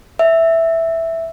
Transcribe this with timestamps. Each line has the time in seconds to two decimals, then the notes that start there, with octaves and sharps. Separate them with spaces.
0.19 E5